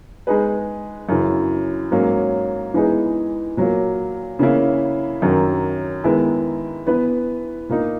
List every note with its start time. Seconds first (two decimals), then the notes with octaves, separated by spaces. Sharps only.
0.27 G#3 D#4 G#4 B4
1.09 F#2 C#3 E3
1.91 G#2 F#3 A#3 C#4
2.74 E3 G#3 B3 D#4 G#4
3.57 A#2 F#3 A#3
4.39 C#3 E3 A#3 C#4 E4
5.22 F#2 D#3 F#3 C#4
6.04 D#3 G#3 B3 E4
6.87 E3 B3 E4 B4
7.69 A#2 A#3 D#4